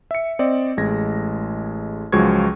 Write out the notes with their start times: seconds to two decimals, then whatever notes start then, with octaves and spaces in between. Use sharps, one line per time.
0.11 E5 C#7
0.39 C4 D5 D#5
0.77 A1 G#3 G#6 A#6
2.12 C#2 F3 F#3 G#3 C#6 G#6